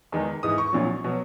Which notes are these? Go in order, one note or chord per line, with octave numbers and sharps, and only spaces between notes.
E2 D#3 G#3 D#4
G#2 E3 G#3 D#6
C#6
A#1 A#2 F#3
B2 F#3